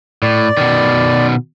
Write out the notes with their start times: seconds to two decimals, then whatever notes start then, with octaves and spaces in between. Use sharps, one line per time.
0.23 A2 D5
0.57 B2 D#3